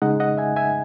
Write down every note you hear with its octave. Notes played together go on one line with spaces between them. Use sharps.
C#3 G#3 D#4 D#5 F#5
D#5 F#5
E5 G#5
E5 G#5